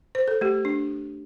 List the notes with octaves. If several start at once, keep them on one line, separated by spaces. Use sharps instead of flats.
C5
A4
A3 G4
D4